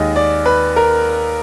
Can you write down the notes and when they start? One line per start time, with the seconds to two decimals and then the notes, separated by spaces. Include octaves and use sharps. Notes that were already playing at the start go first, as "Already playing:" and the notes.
Already playing: D#2 D#3 G#3 D#5
0.16 D5
0.46 B4
0.76 A#4